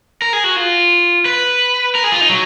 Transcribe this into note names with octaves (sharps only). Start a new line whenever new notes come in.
A#4
G#4
F#4
F4
B4
A#4
G#4
F4
D#4
F#3